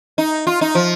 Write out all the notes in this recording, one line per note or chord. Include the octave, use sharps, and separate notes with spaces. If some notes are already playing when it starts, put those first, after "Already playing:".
D#4
F4
D#4
F3